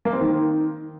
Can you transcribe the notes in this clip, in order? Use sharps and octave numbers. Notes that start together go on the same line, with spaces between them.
A#3
C4
D#3